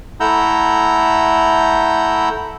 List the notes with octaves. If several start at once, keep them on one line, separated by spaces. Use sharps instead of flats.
A3 E4 F#5 A#5 E6 G6